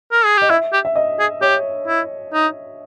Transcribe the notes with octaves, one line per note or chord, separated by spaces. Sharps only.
A#4
G#4
G4 D#5
E4 E5
G4
E5
D#5
G#4
G4 C#5
E4
D#4